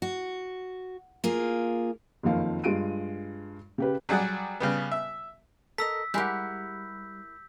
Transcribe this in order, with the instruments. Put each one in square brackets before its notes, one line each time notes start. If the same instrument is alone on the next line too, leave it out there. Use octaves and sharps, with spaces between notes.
[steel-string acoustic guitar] F#4
A#3 F4 G#4
[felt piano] F#1 F2 D#3 F3 F5
G2 G#3 F4 D7 D#7
C#3 G4 B4
[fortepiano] F#3 G3 G#4 D5 F#5
C#3 G3 B3
E5
[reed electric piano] A4 [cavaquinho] A#4 D#5 [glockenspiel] E6 B6
[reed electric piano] G3 [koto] G#3 G4 [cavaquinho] E4 A#4 F#5 [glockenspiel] G6